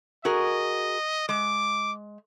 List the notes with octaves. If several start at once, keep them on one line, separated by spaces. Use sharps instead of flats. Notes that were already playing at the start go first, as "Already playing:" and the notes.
F#4 G#4 A#4 D#5
G#3 D6